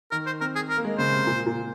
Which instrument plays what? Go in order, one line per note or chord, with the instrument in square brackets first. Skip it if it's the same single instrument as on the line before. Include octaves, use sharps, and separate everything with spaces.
[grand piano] D#3 [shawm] A#4
[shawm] C5
[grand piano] C4 [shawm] A#4
[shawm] G#4
A#4
[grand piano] A#3
G#3
[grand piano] C#3 [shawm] C5
[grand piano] C3
A#2
A#2